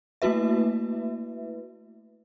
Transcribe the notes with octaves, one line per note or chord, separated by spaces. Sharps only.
A3 A#3 E4 F#4 B4 E5